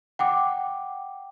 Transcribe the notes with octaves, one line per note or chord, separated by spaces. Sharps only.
F#5 G5 D6